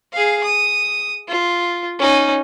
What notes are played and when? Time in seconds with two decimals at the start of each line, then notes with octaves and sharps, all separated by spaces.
0.13 G#4 F5
0.44 D#6
1.28 F4
1.99 C#4 D#4